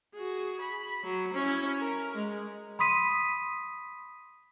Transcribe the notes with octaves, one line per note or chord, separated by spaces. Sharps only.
F#4 G#4
B5
F#3
C#4 E4
A#4
G#3
B5 C6 D#6 B6 D#7